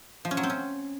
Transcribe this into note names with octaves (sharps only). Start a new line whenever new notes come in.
F3
C#4
F#3
C4
C#4